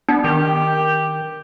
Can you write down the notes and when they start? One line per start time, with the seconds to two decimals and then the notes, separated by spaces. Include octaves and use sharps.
0.09 B3 D4
0.24 D#3 G4